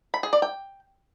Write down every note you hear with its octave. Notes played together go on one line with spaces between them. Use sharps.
B5
G#4
D5
G5